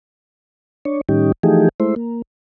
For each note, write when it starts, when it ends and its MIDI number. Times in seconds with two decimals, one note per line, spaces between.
0.85 1.01 62
0.85 1.01 73
1.09 1.32 45
1.09 1.32 51
1.09 1.32 55
1.09 1.32 61
1.09 1.32 63
1.09 1.32 67
1.43 1.69 52
1.43 1.69 53
1.43 1.69 57
1.43 1.69 63
1.43 1.69 67
1.43 1.69 68
1.80 1.95 56
1.80 1.95 57
1.80 1.95 64
1.80 1.95 72
1.96 2.22 58